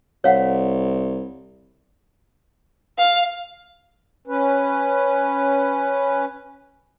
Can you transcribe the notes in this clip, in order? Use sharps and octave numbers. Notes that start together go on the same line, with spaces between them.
C2 C#5 F5 F#5
F5
C#4 B4